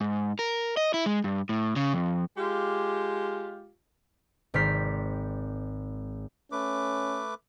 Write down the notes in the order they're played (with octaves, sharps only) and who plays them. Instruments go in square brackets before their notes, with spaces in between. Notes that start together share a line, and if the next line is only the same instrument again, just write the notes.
[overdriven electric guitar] G#2
A#4
D#5
E4
G#3
G2
A2
C#3
F2
[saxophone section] G#3 F4 G4
[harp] G#1 C4 D5 F6 B6 C7
[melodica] A3 B4 D6 [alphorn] C#4